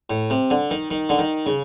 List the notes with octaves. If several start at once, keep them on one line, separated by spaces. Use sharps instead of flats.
A2
C3
D3
D#3
D#3
D3
D#3
C#3